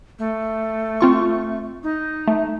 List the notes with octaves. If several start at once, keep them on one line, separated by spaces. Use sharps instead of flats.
A3
C4 F4 C#6
D#4
A3